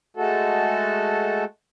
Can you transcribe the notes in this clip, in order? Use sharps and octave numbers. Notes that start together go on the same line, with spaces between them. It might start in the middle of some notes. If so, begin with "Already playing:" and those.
G#3 A3 F#4 A4